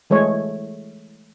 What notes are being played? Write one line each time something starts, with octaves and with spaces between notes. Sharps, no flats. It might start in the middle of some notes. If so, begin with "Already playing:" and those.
E3 G#3 A3 C#5